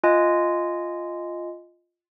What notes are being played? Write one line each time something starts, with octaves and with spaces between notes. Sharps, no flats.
F4 D#5 G#5